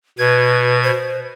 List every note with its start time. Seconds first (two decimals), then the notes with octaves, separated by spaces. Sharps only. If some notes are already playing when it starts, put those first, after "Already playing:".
0.18 B2 B4 G#6
0.83 C5